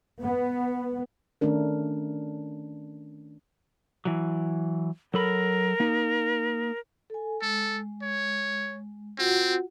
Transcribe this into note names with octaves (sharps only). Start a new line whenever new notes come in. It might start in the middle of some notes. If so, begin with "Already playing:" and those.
B3
D#3 A3 C#4 D4 A#4
E3 F#3
F#3 A4 A#4 B5
A#3 D#4
A4 G#5
G#3 A4
C#5
C4 F4 F#4 F#5